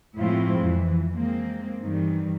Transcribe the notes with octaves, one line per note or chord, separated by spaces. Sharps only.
A2 F3 G#3 C4 E4 F4
F2 E3
G#3 A#3 C4
G2 D#3 E3 G3